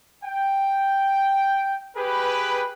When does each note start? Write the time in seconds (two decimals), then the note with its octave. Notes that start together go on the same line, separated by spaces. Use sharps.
0.24 G5
1.96 G4 G#4 B4